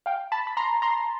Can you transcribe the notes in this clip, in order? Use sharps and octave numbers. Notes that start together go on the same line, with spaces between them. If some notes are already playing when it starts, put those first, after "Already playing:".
F5 G5
A5 B5
B5
A#5 C6
A#5 C6